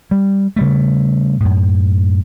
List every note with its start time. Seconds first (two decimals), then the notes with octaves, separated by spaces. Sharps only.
0.11 G3
0.56 C#3 G3 A3
1.40 F#2 A2